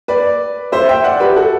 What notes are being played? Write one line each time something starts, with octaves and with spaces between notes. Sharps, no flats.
B4 D5
C5 E5
E5 G5
D5 F#5
G4 B4
F#4 A4